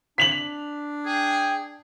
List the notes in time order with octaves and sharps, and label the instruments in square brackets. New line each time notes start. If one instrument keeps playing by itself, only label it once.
[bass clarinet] D4 [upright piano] B6 F7 F#7
[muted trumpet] G#4 [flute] G5